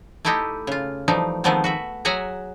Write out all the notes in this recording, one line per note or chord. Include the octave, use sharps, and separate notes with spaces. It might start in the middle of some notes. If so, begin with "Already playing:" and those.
A3 D#4 E4 G4 A4 D#5
C#3 F4
E3 F3 G3 A3 D#4
D#3 F3 G#3 A3 B3 C4
F#4 B4 E5
F#3 G#4 E5 F#5 G#5 A#5